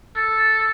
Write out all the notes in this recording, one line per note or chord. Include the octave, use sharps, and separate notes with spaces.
A4